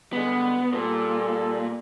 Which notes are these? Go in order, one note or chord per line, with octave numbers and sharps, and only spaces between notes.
D3 G3 G#3 B3
A#2 G3 G#4 A4